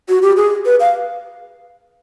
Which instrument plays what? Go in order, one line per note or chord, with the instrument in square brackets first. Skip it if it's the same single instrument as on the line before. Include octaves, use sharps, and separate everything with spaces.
[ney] F#4
G4
G#4
B4
F5